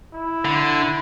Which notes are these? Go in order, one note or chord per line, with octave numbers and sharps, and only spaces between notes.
E4
D3